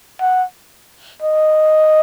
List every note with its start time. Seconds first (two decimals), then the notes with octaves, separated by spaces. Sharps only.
0.21 F#5
1.22 D#5